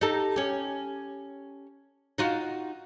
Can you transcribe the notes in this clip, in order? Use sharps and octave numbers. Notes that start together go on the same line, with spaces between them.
D#4 G4 A4
C#4 G4
D#4 F4 F#4